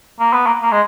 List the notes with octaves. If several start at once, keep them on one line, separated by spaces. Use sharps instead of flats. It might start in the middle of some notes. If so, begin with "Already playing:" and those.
A#3
B3
A#3
A#3
G#3